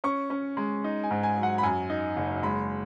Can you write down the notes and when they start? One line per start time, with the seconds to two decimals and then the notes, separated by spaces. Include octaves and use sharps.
0.04 C#4 C#6
0.30 C#4
0.57 G#3
0.84 D#4
1.04 G#5
1.11 G#2
1.23 G#5
1.38 F#3
1.43 F#5
1.58 B5
1.63 F#2 G#5
1.90 D#4
2.17 F#1
2.43 G#3 B5